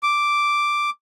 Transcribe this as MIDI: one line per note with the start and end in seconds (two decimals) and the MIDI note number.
0.03 0.90 86